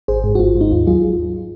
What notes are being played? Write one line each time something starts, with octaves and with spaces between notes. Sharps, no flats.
G#1 G#4 C5
G#2
F#4
G#1 F4
G#2
D#4
D#2 F4
F#3 F4 G#4